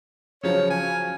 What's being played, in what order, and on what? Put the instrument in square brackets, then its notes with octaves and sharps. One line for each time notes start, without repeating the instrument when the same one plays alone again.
[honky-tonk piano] C#3 F3 F#3 [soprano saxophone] C#5
[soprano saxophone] G#5